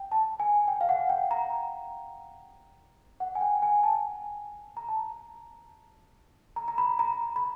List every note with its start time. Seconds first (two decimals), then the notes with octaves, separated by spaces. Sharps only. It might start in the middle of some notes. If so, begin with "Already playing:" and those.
Already playing: G5
0.12 A5
0.40 G#5
0.68 G5
0.81 F5
0.89 F#5
1.10 G5
1.31 A#5
3.20 F#5
3.35 G#5
3.41 G5
3.62 G#5
3.83 A5
4.77 A#5
4.89 A5
6.56 A#5
6.68 A#5
6.78 B5
6.99 A#5
7.36 B5